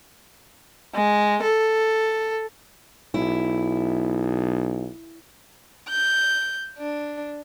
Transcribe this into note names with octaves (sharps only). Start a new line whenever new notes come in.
G#3
A4
B1 E4
G6
D4